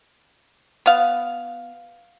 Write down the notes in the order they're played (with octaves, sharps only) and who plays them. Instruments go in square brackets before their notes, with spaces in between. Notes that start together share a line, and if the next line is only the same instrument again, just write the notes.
[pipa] B3 F5